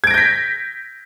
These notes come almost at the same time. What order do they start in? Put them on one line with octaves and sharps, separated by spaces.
G#6 D7 A#6 G6 B6